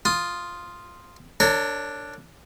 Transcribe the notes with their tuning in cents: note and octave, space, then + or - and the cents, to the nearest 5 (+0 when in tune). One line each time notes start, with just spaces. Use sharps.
F4 +0 D#6 +0
D4 +0 A#4 -45 C#5 -5